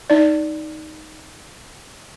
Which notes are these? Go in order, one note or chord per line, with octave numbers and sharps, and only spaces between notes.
D#4 D5